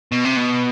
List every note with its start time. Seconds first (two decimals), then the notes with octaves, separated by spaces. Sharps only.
0.12 B2
0.25 C3
0.36 B2